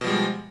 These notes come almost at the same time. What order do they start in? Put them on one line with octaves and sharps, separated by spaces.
B2 F3 G3 G#3